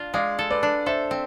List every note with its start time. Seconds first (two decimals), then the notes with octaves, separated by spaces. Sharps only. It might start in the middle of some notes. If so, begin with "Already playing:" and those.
Already playing: D4 F4
0.14 G#3 D5 F5
0.39 A4
0.50 B4 D5
0.63 D4
0.86 A4 C5 E5
1.11 C4